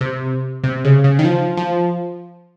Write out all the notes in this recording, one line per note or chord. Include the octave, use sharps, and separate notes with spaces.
C3
C3
C#3
C#3
D#3
F3
F3